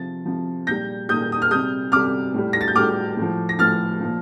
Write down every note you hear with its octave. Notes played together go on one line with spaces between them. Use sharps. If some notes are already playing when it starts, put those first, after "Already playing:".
Already playing: C3 F3 A6
C3 F3
A#2 G3 G6 A#6
A#2 G3 D#6 G6
D#6
F6
C3 G3 D#6 G6
C3 G3 D6 F6
A2 G3
A#6
A6
G6
A2 G3 D6 F6
A2 F3
A#6
A2 F3 F6 A6
A#2 F3